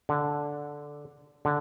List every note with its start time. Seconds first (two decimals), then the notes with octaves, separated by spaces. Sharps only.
0.09 D3
1.45 D3